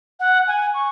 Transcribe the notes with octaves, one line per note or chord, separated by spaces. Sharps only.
F#5
G#5
C#6